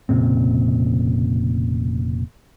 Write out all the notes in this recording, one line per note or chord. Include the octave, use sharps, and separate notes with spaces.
F1 A#2 C#3 C4